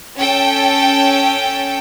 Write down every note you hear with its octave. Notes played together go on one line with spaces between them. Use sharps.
C#4 A4 G5